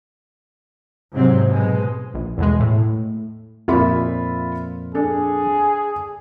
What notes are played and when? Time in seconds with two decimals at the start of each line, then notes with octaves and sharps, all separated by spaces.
1.12 G#2 C3 F#3 C4
1.46 B2 G#3
2.14 A#1
2.37 E2 B2 G#3
2.59 A2
3.68 F2 A#2 F4 E5 B5
4.95 D4 G#4 A4